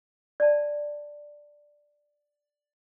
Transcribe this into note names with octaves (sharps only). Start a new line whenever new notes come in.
D5 A5